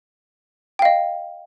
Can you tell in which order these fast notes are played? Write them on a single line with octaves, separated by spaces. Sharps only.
G5 F5 D#5